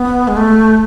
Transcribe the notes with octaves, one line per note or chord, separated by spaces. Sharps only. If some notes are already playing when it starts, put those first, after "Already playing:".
Already playing: B3
G#3
A3